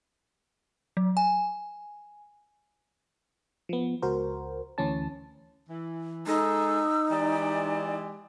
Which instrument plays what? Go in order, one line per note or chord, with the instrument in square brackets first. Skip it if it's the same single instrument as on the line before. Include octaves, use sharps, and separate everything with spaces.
[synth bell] F#3
G#5
[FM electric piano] F3 B3
C#2 F#4 A#4 C5
D2 E3 C#4 A5
[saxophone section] E3
[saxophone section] G#3 A4 [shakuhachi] D#4 [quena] E6
[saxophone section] E3 G#3 G4 [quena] D5